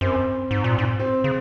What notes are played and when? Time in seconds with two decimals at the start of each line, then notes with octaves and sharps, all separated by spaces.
0.01 F#2 C4
0.51 G#2
0.64 A#2
0.78 G#2
1.00 C4
1.24 C#3